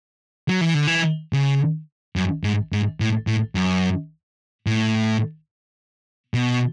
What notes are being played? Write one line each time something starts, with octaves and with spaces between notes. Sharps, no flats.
F#3
E3
D3
E3
C#3
F#2
G#2
G#2
A2
A2
F#2
A2
B2